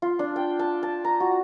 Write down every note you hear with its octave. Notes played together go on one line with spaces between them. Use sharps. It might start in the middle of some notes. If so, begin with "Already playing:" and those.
F4
D4
G5
A5
A5
A#5
F#4